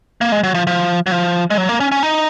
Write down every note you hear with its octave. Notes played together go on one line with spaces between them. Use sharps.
A#3
G#3
F#3
F3
F3
F#3
F3
G#3
F#3
A#3
C#4
C#4
D#4